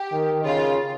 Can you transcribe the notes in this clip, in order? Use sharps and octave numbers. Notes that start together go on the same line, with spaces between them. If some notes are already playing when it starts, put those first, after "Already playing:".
Already playing: G4
D#3
C#3 F4